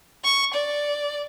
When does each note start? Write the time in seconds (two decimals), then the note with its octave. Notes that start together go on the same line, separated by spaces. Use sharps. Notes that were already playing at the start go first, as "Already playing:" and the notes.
0.24 C#6
0.54 D5